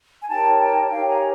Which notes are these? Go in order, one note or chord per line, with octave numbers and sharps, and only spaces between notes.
G#5
D#4 G4 A#4 C#5 G5 A5
G5 A5
D#4 G4 A#4 C#5 F5 G5
G#5 A#5